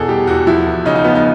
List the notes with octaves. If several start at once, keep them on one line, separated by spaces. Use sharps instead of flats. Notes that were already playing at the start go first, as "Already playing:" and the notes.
Already playing: E2 B2 G#4 A4
G3 G4
E2 F#4
F3 E4
E2
C#3 D#4
D#4
F3 B3
D#4